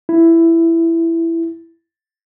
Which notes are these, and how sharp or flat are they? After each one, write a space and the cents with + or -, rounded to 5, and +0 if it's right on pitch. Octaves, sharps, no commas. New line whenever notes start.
E4 +10